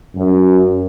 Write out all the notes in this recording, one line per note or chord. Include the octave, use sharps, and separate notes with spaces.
F#2